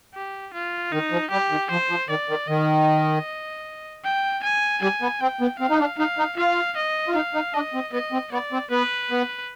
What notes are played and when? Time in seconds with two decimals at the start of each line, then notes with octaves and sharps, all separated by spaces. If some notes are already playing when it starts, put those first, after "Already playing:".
0.15 G4
0.54 F4
0.92 D#3 D#4
1.12 F3
1.31 G3 G4
1.51 D#3
1.71 F3 C5
1.90 F3
2.09 D#3 D5
2.29 D#3
2.48 D#3 D#5
4.05 G5
4.44 G#5
4.82 G3 G#5
5.02 B3
5.20 C4 G5
5.41 B3
5.60 C4 F5
5.70 D#4
5.80 D4
5.99 D#4 F5
6.18 D#4
6.37 F4 F5
6.77 D#5
7.08 F4
7.15 D#4 F5
7.34 D#4
7.54 D4 D#5
7.74 C4
7.93 B3 D#5
8.12 C4
8.32 B3 D5
8.52 C4
8.71 B3 B4
9.11 B3